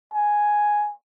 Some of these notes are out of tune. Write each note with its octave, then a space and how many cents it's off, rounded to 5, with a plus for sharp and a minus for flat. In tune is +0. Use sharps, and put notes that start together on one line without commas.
G#5 +0